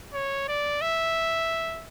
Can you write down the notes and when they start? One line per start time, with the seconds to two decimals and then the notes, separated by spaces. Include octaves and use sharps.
0.14 C#5
0.48 D5
0.81 E5